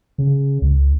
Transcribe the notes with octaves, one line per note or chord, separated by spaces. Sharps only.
C#3
C#2